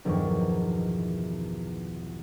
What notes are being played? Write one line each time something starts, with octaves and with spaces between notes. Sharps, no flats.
B1 E2 G2 D#3 F3 C#6